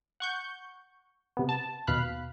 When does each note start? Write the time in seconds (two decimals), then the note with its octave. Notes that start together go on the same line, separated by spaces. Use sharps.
0.20 F#5 C#6 G6
1.37 C3 B3
1.49 A5
1.87 D#2 B2 F5 B5 F#6